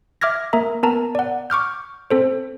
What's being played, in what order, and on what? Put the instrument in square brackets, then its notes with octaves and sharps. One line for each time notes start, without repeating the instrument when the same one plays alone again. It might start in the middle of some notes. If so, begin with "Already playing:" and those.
[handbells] E5 D6 F6 G#6 A#6
A#3 A#4 E5 A#5
B3 A#4 A5 A#5
D5 F#5
C#6 D6 F6 G6
C4 A4 C5